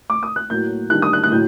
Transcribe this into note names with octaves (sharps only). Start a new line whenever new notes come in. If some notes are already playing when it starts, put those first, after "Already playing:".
D6
D#6
F#6
A2 F#3 A#3 G6
D#3 G3 D4 F#6
D#6
F#6
F#6
A2 F#3 G6